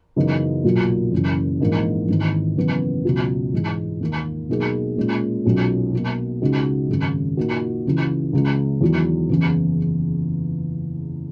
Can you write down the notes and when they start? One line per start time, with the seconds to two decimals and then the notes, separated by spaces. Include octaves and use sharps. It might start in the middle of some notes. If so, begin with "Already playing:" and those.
0.16 F#2 C#3 E3 B3 D#4
0.64 B1 A#2 F#3
1.12 F#1 F#2 E3
1.60 A#1 G#2 E3 A#3 D#4
2.08 G#1 G#2 E3
2.57 F#1 F#2 E3 B3
3.05 C#2 B2 F#3
3.53 G#2 E3 G#3
4.00 D#2 D#3 A#3
4.49 B2 F#3 A#3 D#4 G#4
4.96 A#2 G#3 C#4
5.45 B1 A#2 F#3 C#4
5.93 B2 F#3 A#3
6.42 C#2 C#3 G#3 D#4 F#4
6.89 G#1 F#2 C#3
7.37 A#2 A#3 D#4 F#4
7.85 C#2 C#3 E3
8.33 C#2 C#3 G#3
8.81 E2 D#3 F#3
9.29 F#1 E2 C#3 E3